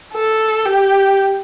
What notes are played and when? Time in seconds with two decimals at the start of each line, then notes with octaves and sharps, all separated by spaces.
0.13 A4
0.65 G4